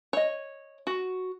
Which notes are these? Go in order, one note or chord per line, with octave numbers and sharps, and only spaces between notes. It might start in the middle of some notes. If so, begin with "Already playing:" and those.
C#5 D#5
F#4